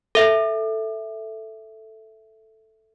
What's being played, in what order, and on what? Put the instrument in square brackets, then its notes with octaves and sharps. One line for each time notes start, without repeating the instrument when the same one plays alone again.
[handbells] A4 E5